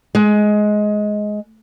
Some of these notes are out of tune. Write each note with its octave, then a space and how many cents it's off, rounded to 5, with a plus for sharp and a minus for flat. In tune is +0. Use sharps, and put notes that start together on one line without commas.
G#3 +15